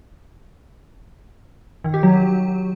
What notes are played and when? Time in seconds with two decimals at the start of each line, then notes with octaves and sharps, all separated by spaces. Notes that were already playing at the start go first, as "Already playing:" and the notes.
1.84 D#3
1.94 G4
2.03 F#3